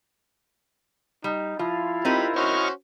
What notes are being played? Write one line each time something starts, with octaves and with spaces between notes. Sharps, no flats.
G3 D#4
F3 E4 F4
C4 D#4 G4 A#4 B5
C#4 F#4 C5 D#5 C#6 F6